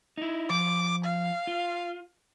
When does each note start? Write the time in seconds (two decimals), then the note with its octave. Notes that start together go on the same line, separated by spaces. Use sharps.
0.17 D#4 E4
0.50 F3 D6
1.04 F5
1.47 F4